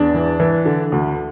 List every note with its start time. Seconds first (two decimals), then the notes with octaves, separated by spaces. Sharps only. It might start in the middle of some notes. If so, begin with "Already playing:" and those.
Already playing: E2 D4
0.14 E3
0.40 E3
0.65 D3
0.92 D2